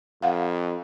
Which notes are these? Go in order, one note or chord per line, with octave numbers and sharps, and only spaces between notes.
F2 F5 F#5